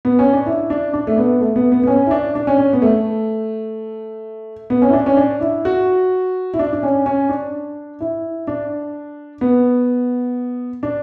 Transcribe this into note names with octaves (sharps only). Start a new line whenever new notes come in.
B3
C#4
D4
E4
D4
D4
A3
B3
A3
B3
B3
B3
C#4
E4
D4
D4
C#4
C#4
B3
A3
B3
C#4
E4
D4
C#4
D4
E4
F#4
E4
D4
D4
C#4
C#4
D4
E4
D4
B3
D4